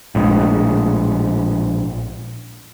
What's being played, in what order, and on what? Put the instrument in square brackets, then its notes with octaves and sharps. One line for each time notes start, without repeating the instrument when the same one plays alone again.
[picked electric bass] A#1 A2 G#3